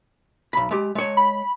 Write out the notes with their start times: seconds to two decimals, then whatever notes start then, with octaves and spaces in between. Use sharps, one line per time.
0.53 B1 B5
0.71 G#3 G4
0.95 G#3 C#5
1.17 B5